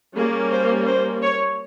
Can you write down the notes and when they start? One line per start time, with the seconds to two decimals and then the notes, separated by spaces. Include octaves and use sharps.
0.17 G3 A#3 C#4 G#4
0.52 C5
0.87 C5
1.22 C#5